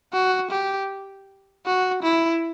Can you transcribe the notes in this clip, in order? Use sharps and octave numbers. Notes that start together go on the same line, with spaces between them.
F#4
G4
F#4
E4